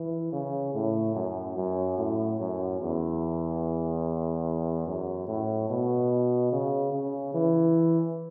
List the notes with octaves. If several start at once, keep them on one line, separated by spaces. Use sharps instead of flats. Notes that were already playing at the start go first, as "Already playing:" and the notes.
Already playing: E3
C#3
A2
F#2
F#2
A2
F#2
E2
F#2
A2
B2
C#3
C#3
E3